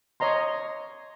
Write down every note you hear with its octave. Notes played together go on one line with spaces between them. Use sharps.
C#5 D#5 A#5 C6